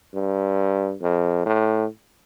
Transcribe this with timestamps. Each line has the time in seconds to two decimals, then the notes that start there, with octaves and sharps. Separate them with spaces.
0.14 G2
1.02 F2
1.46 A2